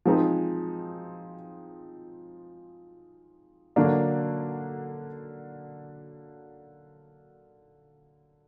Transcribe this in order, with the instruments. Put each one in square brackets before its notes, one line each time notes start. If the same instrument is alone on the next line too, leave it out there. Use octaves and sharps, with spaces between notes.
[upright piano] F3 G#3 C4 D#4
D3 F#3 A#3 D4